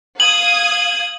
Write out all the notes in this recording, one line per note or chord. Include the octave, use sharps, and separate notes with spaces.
F5 D#6 G#6 F#7